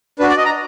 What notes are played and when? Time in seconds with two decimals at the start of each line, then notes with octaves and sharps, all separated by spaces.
0.19 D4 F#4 B4
0.29 D5
0.37 D#5
0.45 A#5